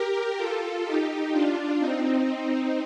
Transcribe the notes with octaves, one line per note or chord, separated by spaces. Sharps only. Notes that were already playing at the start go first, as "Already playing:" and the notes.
Already playing: G4 A#4
F4 A4
D#4 G4
D4 F4
C4 D#4